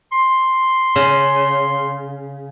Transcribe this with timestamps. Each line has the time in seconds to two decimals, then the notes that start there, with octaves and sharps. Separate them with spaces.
0.12 C6
0.96 C#3